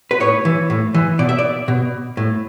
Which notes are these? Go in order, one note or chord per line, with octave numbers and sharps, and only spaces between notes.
B4
A2 C#5
E3
A2
E3
B2 D5
E5
D5
B2
A2